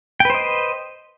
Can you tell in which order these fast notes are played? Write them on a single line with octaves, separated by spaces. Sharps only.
G5 B4 C5 D#5